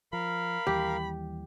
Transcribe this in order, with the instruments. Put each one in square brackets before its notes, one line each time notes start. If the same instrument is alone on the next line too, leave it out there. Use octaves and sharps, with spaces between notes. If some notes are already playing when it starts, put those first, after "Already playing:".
[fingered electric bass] F3 [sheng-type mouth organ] A#4 F5 [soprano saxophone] B5
[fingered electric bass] D#2 E3 G3 [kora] G4